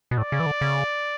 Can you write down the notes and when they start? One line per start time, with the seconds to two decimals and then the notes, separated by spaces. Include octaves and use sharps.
0.11 B2
0.16 A2 D5
0.32 C#3
0.40 E3
0.46 D3
0.61 C#3